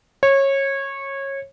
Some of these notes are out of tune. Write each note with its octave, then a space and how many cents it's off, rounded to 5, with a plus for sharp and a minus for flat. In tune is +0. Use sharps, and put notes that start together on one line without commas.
C#5 -20